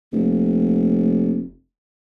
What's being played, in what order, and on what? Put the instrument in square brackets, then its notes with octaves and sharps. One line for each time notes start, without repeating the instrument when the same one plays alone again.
[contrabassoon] F1 [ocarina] A#3